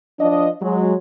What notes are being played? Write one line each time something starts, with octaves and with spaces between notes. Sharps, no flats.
F3 D4 D5 D#5
F#3 G#3